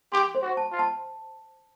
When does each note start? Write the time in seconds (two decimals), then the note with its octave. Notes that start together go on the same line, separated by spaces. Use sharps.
0.12 G4 C6
0.35 C5
0.42 F#4
0.57 A5
0.72 F4
0.79 A5